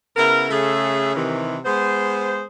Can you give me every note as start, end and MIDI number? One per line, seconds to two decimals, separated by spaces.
0.16 0.51 49
0.16 0.51 59
0.16 0.51 64
0.16 0.51 70
0.51 1.14 49
0.51 1.14 57
0.51 1.14 61
0.51 1.14 68
0.51 1.14 69
0.51 1.14 76
1.15 1.57 48
1.15 1.57 51
1.15 1.57 52
1.65 2.43 56
1.65 2.43 59
1.65 2.43 68
1.65 2.43 72